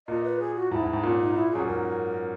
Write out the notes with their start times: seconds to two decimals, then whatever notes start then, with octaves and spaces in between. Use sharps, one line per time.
0.08 A#2 D#5
0.24 B4
0.40 G#4
0.55 F#4
0.71 G#2 E4
0.82 G#2
0.93 G#2
1.03 A#2 C#4
1.19 D#4
1.35 E4
1.51 F#2 G#4
1.67 G#2 A#4